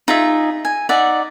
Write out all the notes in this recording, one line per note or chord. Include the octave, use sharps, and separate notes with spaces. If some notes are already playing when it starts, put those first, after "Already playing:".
D#4 F4 G#4 E5
G#5
D#4 D5 E5 F#5